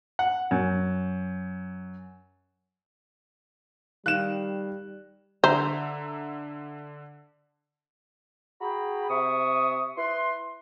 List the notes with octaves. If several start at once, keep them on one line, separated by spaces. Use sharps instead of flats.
F#5
F#2
D#3 G3 F5 F#6 E7
D3 C5 E5 A#5 E6
F#4 G#4 G5 A#5 B5
C3 E5 C#6 D#6
E4 B4 C6